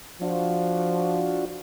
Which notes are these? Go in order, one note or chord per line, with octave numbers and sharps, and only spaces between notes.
F3 D4 F4 F#4